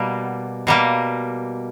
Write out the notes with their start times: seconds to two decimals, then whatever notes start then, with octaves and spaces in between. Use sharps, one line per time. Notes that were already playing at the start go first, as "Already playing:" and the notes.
Already playing: B2 G3 A#3
0.67 B2 G3 A#3